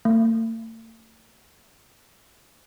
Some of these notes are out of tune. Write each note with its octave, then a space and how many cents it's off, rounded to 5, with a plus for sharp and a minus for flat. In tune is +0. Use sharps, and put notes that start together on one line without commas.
A3 +45